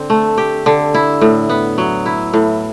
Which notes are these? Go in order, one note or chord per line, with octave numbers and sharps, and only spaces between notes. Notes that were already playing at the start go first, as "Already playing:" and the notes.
Already playing: D3 C4
A3
G4
D3
E4
A2
B3
F#3
E4
A2